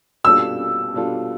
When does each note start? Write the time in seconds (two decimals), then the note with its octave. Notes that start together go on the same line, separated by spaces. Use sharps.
0.24 B2 G3 D4 F4 A4 E6
0.94 B2 G3 D4 F4 A4